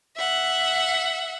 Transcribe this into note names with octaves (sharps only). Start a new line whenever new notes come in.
E5 F#5